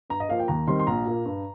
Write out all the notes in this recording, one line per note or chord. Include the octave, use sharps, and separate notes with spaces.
G2 A#5
D#5
F3 A#3 F5
G5
D#2 A#5
D#3 G3 C4 C6
C6
A#1 A#5
A#2 A#3
G2